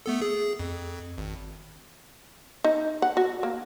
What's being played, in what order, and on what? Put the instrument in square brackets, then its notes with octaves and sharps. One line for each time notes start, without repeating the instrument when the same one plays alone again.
[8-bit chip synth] A3 B3 A4
G#4
F2
G#1
[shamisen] D#4
F#5
F#4
A#3